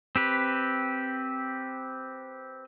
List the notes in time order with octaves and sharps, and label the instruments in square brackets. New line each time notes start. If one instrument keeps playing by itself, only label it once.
[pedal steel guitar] C4 G4 B4